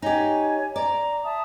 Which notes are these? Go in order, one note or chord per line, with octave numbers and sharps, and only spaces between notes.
D#4 G4 C#5 G#5
D5 A#5
E5 A5 D#6